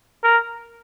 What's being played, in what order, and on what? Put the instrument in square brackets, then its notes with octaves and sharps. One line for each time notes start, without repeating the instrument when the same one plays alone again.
[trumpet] A#4